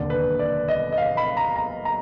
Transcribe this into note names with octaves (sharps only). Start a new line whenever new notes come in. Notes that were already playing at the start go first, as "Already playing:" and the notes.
Already playing: F1 D#2 D3 D5
B4
D5
D#5
D#5
F5
B5
A#5
A#5
A#5